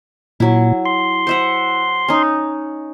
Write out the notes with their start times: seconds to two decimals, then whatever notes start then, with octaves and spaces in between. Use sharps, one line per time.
0.40 A#2 F#3 E4
0.86 C6
1.27 C5 E5 F#5
2.08 C#4 D#4